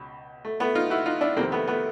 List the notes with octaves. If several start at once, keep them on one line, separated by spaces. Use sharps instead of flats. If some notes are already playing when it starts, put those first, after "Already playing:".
Already playing: C#2 B2
A3
A3 B3
D#4 F4
E4 F#4
D#4 F4
D4 E4
F2 C3 D#3 A#3 C4
A3 B3
A3 B3